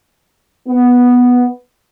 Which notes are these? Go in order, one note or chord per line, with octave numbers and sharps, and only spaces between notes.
B3